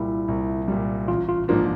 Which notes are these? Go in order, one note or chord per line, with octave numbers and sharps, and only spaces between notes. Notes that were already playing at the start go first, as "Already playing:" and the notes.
Already playing: C2 A#2 G3 E4
C2
A#2 G3
A1 F4
F4
G#2 F3 A#3 D4 F4